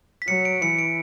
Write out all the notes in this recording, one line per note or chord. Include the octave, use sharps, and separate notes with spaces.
B6
F#3 C#7
D7
E3 C#7
D7